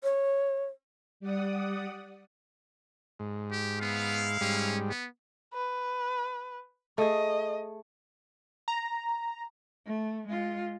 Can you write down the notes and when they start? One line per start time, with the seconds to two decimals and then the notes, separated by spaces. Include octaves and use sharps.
0.03 C#5
1.20 G3 D5 F#5 D#6
3.20 G#2
3.52 G4
3.81 B3 E4 F5
4.41 G#2 G3 C#4
4.90 B3
5.54 B4
6.98 A3 G#4 D#5
8.68 A#5
9.86 A3
10.27 G#3 F4